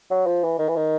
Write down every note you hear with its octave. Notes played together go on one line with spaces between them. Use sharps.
F#3
F3
E3
D#3
E3
D#3